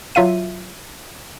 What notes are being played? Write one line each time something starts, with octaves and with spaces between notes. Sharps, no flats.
F#3 F4 E5 F5 D#7